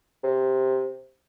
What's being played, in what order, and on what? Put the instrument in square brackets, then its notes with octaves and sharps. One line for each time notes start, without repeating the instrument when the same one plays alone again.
[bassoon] C3